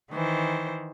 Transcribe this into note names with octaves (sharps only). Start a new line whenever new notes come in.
D#3 E3 C5